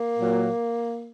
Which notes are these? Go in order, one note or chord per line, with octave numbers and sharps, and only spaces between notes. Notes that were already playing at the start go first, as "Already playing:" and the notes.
Already playing: A#3
A#2 F#3